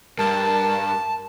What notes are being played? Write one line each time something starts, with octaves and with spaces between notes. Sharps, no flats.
G2 A#4 A5